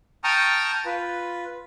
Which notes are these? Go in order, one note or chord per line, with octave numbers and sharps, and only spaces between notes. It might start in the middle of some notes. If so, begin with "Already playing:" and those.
G5 A5 A#5 C#6 D#6 F6
F4 B4